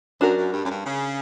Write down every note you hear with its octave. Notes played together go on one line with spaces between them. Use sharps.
F#2 D4 F#4 A#4
F#2
G2
F#2
G2
C#3